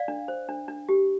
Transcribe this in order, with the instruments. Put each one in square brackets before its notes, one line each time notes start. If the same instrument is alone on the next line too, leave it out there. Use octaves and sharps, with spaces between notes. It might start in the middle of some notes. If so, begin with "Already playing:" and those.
Already playing: [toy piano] D5 F5
D4
C5
D4
D4
G4